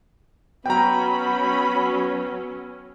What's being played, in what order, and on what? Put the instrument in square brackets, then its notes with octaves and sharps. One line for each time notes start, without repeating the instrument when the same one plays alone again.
[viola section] F#3 C#4 [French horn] B3 [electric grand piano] G5 A#5 [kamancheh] B5